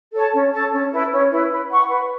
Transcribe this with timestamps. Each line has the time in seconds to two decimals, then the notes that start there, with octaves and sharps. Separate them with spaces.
0.13 A4 C#5 A5
0.33 C#4
0.53 A4 C#5 A5
0.72 C#4
0.91 E4 B4
1.11 C#4
1.31 E4 B4
1.51 B4
1.71 F#5 C#6
1.90 B4